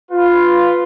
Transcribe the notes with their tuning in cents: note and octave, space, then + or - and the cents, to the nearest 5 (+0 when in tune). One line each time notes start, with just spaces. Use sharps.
F4 +0 B4 +10